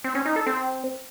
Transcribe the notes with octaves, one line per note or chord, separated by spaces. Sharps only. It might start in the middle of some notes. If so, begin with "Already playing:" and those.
C4
C#4
D#4
A4
C4